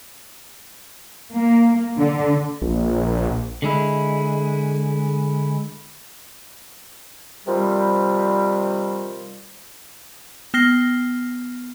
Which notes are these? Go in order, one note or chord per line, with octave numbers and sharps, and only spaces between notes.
A#3
D3
A#1
D3 G#3 E4
C3 D#3 F3 G3
B3 F6 A#6 C7 G7